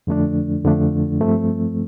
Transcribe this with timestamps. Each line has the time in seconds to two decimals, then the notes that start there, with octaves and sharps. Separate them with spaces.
0.07 F2 D3 F3 A3 D4
0.64 F2 D3 F3 A3 D4
1.20 G2 F3 A3 C4